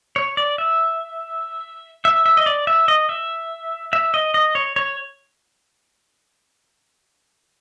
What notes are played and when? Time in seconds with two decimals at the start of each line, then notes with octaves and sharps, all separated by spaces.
0.16 C#5
0.37 D5
0.58 E5
2.05 E5
2.26 E5
2.37 D#5
2.46 D5
2.67 E5
2.88 D#5
3.09 E5
3.93 E5
4.14 D#5
4.34 D#5
4.55 C#5
4.76 C#5